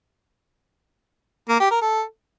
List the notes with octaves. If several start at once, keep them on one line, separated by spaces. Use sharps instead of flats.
A#3
G4
A#4
A4